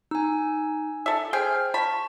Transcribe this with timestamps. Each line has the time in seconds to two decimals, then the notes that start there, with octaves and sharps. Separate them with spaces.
0.11 D#4 G#5 E6
1.06 A4 E5
1.33 G#4 C5 G5 F6
1.74 A5 B5 C#6